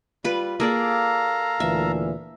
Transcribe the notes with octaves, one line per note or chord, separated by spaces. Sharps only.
G3 F4 B4
A#3 G#4 A4 D5 F5 A#5
D2 A#2 E3 E5